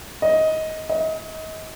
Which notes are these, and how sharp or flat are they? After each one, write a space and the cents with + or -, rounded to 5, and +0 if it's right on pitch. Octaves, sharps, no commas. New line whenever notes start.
D#5 +15
D#5 +35